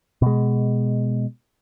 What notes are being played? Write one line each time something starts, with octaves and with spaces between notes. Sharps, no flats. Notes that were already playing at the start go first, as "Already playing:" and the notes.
B2 G#3